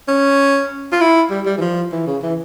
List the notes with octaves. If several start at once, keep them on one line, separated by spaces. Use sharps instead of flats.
C#4
F4
E4
G3
G3
E3
F3
E3
C#3
E3